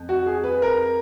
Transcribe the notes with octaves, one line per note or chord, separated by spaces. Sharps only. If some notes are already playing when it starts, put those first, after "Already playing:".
Already playing: F2
F#4
G#4
B4
A#4